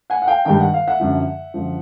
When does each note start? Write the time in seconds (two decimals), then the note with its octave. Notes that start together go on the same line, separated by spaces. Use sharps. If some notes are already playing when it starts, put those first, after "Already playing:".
0.10 F#5 G#5
0.22 F#5
0.27 F5 G5
0.45 G2 D#3 G5
0.60 F#5
0.74 F5
0.88 E5 F#5
1.00 F#2 D3 F3
1.54 F#2 D3 F3